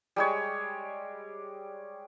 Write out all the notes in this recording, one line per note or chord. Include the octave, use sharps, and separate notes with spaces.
G3 G#3 C#5